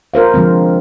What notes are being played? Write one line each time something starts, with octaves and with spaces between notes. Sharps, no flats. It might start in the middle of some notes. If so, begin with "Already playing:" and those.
F4 A#4 C5 F5
D3 F3 G#3 C4